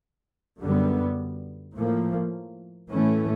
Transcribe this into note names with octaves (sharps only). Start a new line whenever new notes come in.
F#2 D3 G3 B3
A2 F3 A#3
A2 E3 A3 C#4